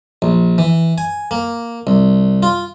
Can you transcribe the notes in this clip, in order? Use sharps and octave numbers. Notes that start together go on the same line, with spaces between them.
A#1
E3
G#5
A#3
C2
F4